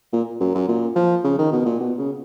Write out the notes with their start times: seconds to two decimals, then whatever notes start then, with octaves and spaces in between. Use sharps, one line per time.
0.13 A#2
0.40 F#2
0.55 F#2
0.68 A#2
0.96 F3
1.24 C#3
1.39 D#3
1.53 B2
1.66 A#2
1.80 B2
1.98 C#3